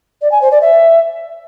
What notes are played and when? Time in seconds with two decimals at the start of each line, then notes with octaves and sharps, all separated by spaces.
0.22 D5
0.31 G#5
0.41 C5
0.51 D5
0.61 E5